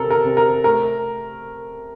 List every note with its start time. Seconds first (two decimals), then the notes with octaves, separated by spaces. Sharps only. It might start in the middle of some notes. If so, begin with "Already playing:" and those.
Already playing: C3 A4 A#4
0.10 A#4
0.24 C3
0.37 A#4
0.64 A3 A#4